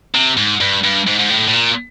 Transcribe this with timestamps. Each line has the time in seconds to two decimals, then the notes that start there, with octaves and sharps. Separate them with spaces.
0.15 C3
0.37 G#2
0.61 G2
0.84 G2
1.08 G#2
1.20 G#2
1.30 A2
1.48 A2
1.54 A#2